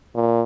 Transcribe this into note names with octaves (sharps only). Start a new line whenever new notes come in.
A#2